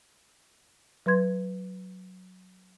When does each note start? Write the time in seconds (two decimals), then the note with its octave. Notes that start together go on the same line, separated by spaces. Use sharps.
1.06 F#3 B4 C6 G#6